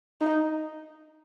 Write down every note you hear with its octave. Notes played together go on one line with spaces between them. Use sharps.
D#4